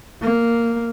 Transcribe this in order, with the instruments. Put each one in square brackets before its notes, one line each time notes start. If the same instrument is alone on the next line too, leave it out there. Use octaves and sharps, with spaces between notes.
[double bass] A#3